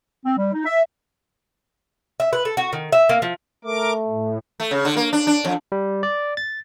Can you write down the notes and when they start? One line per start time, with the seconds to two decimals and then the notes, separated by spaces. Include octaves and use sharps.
0.25 C4
0.38 G3
0.53 D#4
0.66 E5
2.20 E5
2.33 B4
2.45 A4
2.57 F#4
2.73 D#3
2.92 E5
3.09 A#3
3.22 F3
3.65 A3 A#4 D6
4.08 A2
4.60 A3
4.71 C#3
4.85 D3
4.96 A#3
5.13 D4
5.27 D4
5.45 F2
5.72 G3
6.03 D5
6.37 A6